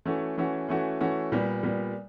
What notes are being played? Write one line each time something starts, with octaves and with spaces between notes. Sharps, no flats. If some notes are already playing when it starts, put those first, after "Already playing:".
E3 A3 C#4 F#4
E3 A3 C#4 F#4
E3 A3 C#4 F#4
E3 A3 C#4 F#4
A#2 G3 B3
A#2 G3 B3